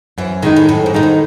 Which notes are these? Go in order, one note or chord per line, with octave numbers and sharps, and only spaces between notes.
F#2 E3
A2 D#3 G#3 D#4
A2
F#2 A2
G#2
B2 D#3 G#3 D#4
A2